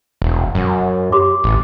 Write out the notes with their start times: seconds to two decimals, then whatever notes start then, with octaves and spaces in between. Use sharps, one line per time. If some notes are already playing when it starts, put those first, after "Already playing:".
0.22 E1
0.55 F#2
1.12 G4 C6 D6
1.44 A1